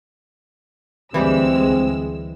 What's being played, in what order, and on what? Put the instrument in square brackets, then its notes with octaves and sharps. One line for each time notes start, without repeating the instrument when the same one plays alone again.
[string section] D2 G#3 E6 [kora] E3 G3 G4 [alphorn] C4